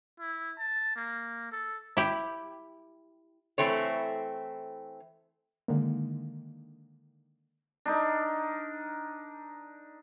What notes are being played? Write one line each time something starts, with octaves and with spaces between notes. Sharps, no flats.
E4
A5
A#3
A4
E4 G4
E3 A3 C4 C#5
D3 D#3 G#3 A#3
D4 D#4 A#4